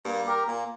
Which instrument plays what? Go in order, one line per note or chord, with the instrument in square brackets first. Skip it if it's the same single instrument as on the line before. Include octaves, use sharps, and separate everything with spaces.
[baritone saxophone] G2 [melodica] A#3
[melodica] G4 A#4
[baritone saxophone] A#2 [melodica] A#3